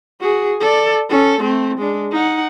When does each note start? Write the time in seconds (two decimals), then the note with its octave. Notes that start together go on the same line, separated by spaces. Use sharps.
0.20 F#4 G#4
0.60 A4 D5
1.10 C#4 A4
1.41 A3 C4
1.78 G#3 D4
2.12 D#4 F#5